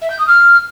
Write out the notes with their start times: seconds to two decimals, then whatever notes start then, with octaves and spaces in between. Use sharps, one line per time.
0.01 E5
0.10 G6
0.18 D#6
0.27 F6